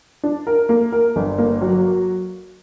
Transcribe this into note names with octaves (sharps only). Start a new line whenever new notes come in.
D4
A#4
A#3
A#4
G1
A#3
F#3